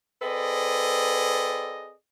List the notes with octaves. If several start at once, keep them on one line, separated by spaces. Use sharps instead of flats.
C4 G#4 A4 B4 D5 D#5